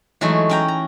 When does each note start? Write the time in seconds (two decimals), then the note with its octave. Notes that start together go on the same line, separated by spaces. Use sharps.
0.21 E3 F#3 G#3 A3 D#4 F#4
0.49 C#4 G5 A#5
0.68 A#5